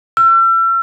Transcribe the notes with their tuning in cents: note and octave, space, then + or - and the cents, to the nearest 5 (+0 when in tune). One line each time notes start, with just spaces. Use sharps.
E6 +40